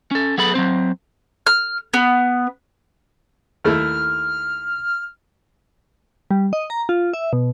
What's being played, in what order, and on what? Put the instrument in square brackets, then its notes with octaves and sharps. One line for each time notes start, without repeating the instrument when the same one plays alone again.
[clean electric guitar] C#4 A4
F#3 B3 G#4 A4 B5
F#3 G#3 C4 C5
[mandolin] F6
B3
[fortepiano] D#2 A3 E4 [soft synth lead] F6
[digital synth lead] G3
D#5
A#5
F4
E5
B2